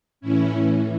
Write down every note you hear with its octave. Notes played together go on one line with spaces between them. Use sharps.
A2 E3 C#4 E4
A2 E3